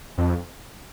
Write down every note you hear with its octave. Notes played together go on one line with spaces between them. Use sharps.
F2